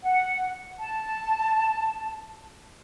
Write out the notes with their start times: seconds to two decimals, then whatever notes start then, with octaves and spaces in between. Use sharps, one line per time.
0.03 F#5
0.80 A5